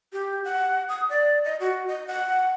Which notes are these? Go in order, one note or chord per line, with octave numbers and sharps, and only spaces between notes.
G4
F#5
D#6
D5
D#5
F#4
D#5
F#5